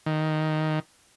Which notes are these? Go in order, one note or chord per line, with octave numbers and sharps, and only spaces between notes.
D#3